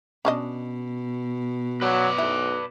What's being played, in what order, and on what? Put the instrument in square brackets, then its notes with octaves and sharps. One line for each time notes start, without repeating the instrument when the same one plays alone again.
[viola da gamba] B2 [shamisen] C#4 D4 D#5
[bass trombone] F#3 [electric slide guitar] B4 D5
[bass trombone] B1 [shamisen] E4